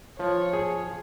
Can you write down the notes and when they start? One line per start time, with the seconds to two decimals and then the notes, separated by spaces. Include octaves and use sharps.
0.19 F3 C#5
0.53 G#4